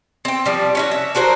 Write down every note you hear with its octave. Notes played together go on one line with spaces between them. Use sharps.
C4 G5
F3 G3
C#4 E4 F#4
E5
D4 F#4 A#4 C5